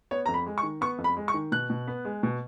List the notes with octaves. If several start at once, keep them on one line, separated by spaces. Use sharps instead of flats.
B3 C#5
F2 A#5
B5
G#3
C#6
D#3
B3 C#6
F2
B5
G#3
C#6
D#3
B2 F#6
B2
B3
G#3
B2